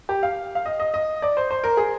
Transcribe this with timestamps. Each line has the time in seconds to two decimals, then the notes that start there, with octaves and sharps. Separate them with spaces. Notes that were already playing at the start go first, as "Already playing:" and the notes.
0.09 G4
0.23 F5
0.55 F5
0.66 D#5
0.80 D#5
0.94 D#5
1.22 D5
1.37 C5
1.51 C5
1.64 A#4
1.77 G#4